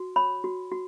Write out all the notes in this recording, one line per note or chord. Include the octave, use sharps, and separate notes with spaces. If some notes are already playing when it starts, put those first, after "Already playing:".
Already playing: F#4
C#5 B5
F#4
F#4